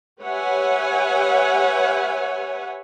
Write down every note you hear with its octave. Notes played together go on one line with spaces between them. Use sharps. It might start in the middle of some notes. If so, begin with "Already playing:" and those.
G4 B4 C#5 E5 F#5 G#5